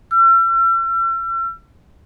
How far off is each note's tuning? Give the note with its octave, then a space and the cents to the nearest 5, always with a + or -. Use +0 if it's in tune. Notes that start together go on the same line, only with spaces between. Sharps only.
E6 +45